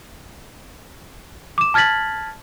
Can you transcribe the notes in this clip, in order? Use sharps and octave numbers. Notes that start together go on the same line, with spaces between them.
D6 E7
A5 F6 G#6 A6 B6 F#7